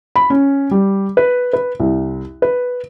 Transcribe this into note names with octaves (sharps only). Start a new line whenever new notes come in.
B5
C#4
G3
B4
B4
C2
B4